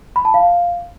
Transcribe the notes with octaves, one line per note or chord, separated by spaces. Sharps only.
B5
A5
F5